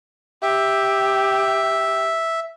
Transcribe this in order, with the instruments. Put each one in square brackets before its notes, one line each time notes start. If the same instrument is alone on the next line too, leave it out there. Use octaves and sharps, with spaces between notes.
[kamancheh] G4 [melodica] E5